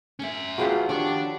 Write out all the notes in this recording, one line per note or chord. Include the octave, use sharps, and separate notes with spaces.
F#2 C#4 A#4 E5 G#5
A1 F#3 F4 F#4 G#4 B4 F#5 G5
D#3 F3 D4 G4 A4 C#5 D5